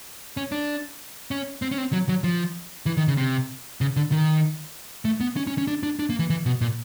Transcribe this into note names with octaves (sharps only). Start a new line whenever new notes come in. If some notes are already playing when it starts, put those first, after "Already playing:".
C#4
D4
C#4
C4
C#4
C4
F#3
F#3
F3
E3
D#3
C#3
C3
C#3
D3
D#3
A3
B3
C#4
C#4
C#4
D4
D4
D4
A#3
E3
E3
B2
A#2